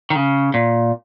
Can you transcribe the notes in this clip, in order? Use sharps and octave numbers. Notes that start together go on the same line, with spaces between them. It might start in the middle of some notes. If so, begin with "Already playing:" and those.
D#3
C#3
A#2